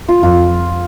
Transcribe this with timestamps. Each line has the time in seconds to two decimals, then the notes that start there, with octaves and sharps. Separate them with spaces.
0.08 F4
0.22 F2 F4